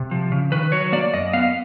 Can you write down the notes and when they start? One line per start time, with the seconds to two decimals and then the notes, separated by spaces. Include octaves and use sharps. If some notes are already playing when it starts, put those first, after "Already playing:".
Already playing: C3
0.11 F3
0.32 C#3
0.52 D#3 B4
0.72 F#3 C#5
0.92 A#3 D5
1.13 F#2 D#5
1.33 B3 F5